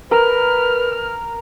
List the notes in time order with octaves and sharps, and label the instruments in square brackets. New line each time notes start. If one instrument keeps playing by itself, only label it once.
[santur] A#4 [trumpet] B4 [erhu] F6